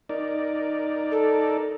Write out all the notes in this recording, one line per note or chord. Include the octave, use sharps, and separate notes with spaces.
D#4 A#4 D5
A4